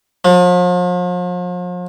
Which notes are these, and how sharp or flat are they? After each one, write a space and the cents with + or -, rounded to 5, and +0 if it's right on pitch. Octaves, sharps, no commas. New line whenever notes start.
F3 +40